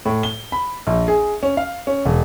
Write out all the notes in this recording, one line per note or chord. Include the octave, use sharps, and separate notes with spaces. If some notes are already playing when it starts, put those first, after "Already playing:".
A2
G7
B5
A#1
G#4
C#4
F5
C#4
E1